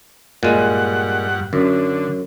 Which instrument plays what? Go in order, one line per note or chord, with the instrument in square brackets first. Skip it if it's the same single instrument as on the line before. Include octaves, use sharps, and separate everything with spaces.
[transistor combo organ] G2 F#5 [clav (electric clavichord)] A#2 G#3
[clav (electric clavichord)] F#2 [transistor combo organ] D3